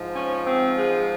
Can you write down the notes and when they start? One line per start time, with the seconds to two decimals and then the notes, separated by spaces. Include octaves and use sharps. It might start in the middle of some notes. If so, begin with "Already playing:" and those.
Already playing: G#2 F3
0.15 C#4
0.47 C4
0.78 G#3